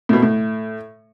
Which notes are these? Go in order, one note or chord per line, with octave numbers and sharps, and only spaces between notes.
A2
B2
A2